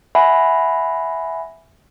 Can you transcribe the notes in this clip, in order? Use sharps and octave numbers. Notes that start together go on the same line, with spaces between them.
E5 F#5 G#5 B5